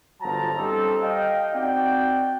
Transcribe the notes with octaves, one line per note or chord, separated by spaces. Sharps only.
G1 F3 F#3 A5 A#5
G3 C4 C#4 D#4 G4 A4
D#5 F5 G5
C4 D#4 F#4 G4 D5 G5